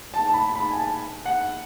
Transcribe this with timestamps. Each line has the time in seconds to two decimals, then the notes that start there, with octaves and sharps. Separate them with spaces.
0.14 A5
0.27 A5
0.34 B5
0.55 B5
0.71 G#5
0.76 A5
1.25 F#5